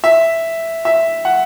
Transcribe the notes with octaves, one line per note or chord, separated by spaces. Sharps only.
E5
E5
F#5